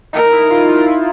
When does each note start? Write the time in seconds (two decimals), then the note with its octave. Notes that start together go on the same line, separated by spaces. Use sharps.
0.13 D#4 A#4
0.32 E4
0.50 F4
0.69 F4
0.87 E4